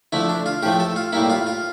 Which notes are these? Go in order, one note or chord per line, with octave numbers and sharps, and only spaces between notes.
D3 F3 A3 E4
D4
F4
A2 F3 A3 G4
A4
F4
A2 G3 A#3 E4
F4
F4